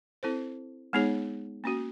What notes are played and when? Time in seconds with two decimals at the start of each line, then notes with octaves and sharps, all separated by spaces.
0.23 C4 E4 A4 C5
0.93 G#3 B3 D#4 G#4 C#5
1.64 A#3 C#4 F#4